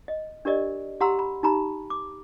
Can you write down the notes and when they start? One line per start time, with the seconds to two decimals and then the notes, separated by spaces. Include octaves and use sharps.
0.08 D#5
0.45 D4 G4 A#4 D5 D#5
1.01 G4 F#5 A#5 C6 E6
1.19 B5
1.43 D#4 G4 A#5 B5
1.90 D6